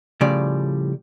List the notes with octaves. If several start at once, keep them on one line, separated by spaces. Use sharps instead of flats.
A2 C#3 F3 G3 D5